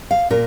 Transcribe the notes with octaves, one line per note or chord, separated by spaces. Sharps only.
F5
A#2 A#4